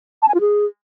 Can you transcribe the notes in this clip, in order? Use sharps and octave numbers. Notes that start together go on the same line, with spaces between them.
A5
G#5
F4
G#4